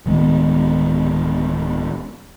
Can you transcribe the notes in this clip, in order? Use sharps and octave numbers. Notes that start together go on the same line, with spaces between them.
D1 D#3 G#3 B3